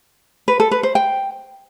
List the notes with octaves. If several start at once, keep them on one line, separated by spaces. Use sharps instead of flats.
B4
A4
B4
C5
G5